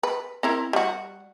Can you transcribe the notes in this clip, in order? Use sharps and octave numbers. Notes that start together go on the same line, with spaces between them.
B4
C4 E4 A#4
G3 F#4